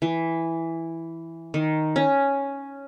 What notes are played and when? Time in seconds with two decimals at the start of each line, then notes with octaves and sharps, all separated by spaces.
0.02 E3
1.54 D#3
1.96 C#4